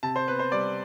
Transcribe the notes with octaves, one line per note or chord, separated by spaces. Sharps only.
C3 A5
C5
B3 B4
C5
G3 D5